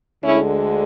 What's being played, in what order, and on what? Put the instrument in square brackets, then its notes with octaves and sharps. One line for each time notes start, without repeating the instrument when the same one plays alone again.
[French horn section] D2 D3 G#3 C#4 E4